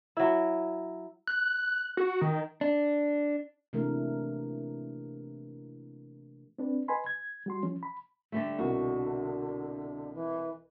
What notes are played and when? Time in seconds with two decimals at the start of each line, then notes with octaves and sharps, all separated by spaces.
0.17 F#3 E4
1.27 F#6
1.97 F#4
2.21 D#3
2.61 D4
3.73 C3 E3 A3 A#3 D4 A#4
6.58 C4 D4 B4
6.88 B4 D#5 G#5 B5 C6
7.06 G#6
7.46 G3 F#4 C6
7.62 E3 F3 C#4
7.83 B5
8.32 D3 G3 A3
8.59 C2 B2 D3 F#4
10.14 E3